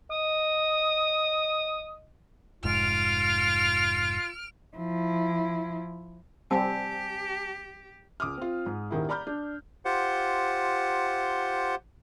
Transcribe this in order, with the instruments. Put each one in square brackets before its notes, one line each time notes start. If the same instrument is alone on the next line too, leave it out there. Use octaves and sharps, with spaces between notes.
[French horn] D#5 [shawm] D#6
[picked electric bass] F1 G#2 [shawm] F4 [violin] F6 D7
[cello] F3 E4
[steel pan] G3 C4 [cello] G4 [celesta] G#5 A5 E6
[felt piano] C#2 D6 D#6 F6
C4 F4
G#2
D#1 D#3 E4
D5 A#5 B5 F6 G6
D4
[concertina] F4 G4 C5 F#5